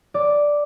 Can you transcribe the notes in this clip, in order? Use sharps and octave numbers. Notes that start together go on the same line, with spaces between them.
D5